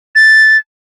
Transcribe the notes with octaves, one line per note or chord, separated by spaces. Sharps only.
A6